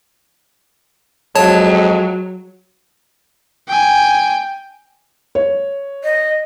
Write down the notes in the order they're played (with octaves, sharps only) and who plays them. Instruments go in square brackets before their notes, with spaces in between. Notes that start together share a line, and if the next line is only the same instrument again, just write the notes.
[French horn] F2 [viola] F#3 [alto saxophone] G#3 [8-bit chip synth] C#5 A5
[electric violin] G5 G#5
[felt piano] C#5
[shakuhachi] D#5